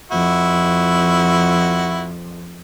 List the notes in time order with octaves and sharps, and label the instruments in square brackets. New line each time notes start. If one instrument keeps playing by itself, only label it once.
[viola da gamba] F2 [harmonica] E4 F#4